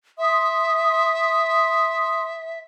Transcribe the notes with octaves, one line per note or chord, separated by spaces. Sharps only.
E5 C6 D#6